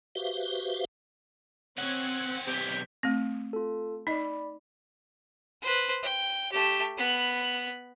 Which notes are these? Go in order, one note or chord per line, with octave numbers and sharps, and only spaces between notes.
F#4 G4 B4 C5 E5 F5
D#3 C4 C#4 C#5 F#5 G#6
B1 G4 G6 G#6 B6
A3 C4
F4 A4
D#4 D5 D#5 B5
B4 C5
G5
A3 G4
B3 B5